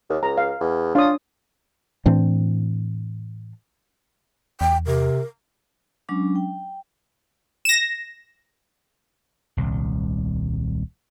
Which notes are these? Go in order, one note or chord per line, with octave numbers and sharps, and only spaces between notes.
D#2
C#2 A#5
F5
E2
D4 F4 C#5 D#6
A2 E3 C4 D4
E2 G5
C3 A#4
F#3 G#3 C#4 D4 D6
G5
A#6 E7
D#1 C2